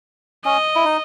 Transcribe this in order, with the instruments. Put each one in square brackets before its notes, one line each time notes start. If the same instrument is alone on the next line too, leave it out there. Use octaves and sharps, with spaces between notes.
[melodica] C#4 [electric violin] D#5
[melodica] E4
D#4